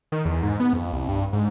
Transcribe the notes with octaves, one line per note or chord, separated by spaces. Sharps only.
D#3
E2
G#2
B3
F2
C2
G2
G#2